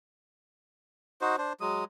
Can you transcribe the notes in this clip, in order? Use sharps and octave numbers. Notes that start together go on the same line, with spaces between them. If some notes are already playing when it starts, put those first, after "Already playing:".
D#4 F#4 C5
D4 C5
F#3 G#3 D#6